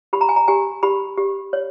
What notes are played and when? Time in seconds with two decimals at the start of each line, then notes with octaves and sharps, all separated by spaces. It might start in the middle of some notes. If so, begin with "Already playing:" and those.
0.13 G4 B5
0.21 A#5
0.29 G#5
0.36 A#5
0.48 G4 G#5
0.83 G4 B5
1.18 G4
1.53 C#5